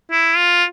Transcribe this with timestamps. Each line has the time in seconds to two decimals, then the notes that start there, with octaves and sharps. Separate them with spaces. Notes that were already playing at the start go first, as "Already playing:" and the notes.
0.11 E4
0.37 F4